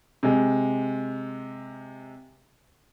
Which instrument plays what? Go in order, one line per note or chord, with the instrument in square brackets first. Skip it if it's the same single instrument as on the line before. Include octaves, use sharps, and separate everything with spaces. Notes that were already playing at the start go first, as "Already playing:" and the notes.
[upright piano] C3 G#3